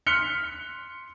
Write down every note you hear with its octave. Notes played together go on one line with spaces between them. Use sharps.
C6 F6 F#6 B6 C#7 G7